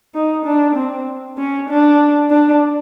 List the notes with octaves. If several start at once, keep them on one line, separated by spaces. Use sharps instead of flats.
D#4
D4
C4
C#4
D4
D4